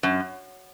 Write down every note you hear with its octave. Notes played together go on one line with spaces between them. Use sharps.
F#2